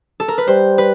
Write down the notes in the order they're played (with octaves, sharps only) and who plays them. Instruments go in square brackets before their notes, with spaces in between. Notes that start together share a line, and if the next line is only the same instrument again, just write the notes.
[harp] A4
A#4
B4
[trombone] G3 [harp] C5
[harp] B4